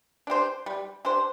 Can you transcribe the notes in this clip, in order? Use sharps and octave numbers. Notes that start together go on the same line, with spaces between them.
D4 G4 C5
G3
D4 G4 C5